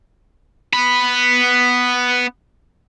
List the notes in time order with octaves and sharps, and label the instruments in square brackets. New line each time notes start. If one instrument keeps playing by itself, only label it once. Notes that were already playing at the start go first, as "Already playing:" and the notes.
[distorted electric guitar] B3 B5